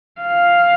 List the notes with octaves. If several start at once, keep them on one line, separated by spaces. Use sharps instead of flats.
F5